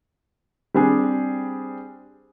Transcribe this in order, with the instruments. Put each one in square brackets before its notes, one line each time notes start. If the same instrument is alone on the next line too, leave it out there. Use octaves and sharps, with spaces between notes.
[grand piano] G3 C4 D4 G#4